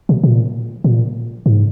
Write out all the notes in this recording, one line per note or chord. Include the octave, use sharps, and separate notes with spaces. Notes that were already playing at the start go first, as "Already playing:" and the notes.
B2
A#2
A#2
G#2